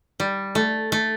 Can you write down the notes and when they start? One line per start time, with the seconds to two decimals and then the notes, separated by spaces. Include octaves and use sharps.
0.20 G3
0.55 A3
0.92 A3